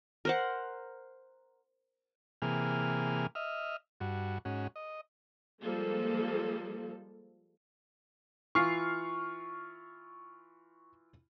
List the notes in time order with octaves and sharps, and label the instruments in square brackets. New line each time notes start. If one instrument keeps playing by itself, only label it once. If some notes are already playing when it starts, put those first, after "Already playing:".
[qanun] A#4 C5 F#5
[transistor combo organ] C3 E3 A#3 G#4 F6
D#5 E5 F6
G2 F#4
G#2 C#4 F#4
D#5
[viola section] F3 G3 G#3 A#3 A4
[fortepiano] E3 F4 [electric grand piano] C#6 F6 C7